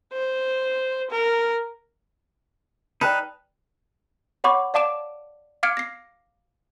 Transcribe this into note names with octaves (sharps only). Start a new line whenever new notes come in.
C5
A#4
D#4 B4 D5 G5 A5 F6 F#6
C#5 F#5 B5 C#6 D6
D5 F5 A5 D6 D7 E7
F5 D6 F6 G#6 C#7 D7
A#6 C7